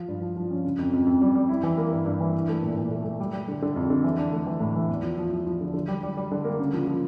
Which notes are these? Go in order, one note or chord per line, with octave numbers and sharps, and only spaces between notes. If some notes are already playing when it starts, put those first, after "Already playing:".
Already playing: F3 F4
G2
F3
F3
C#4
C#3
F2
F2
F2
G3
G3
E4
E3
A#3
G2
G2
E3
E4
A3
A#2
A#2
A3
A3
G3
G3
D3
D3
F2
D3
E3
D4
A3
E3
A2
E3
E2
F3
F3
F3
F3
D3
D3
G3
G3
G3
D3
A#3
C#3
F3
F3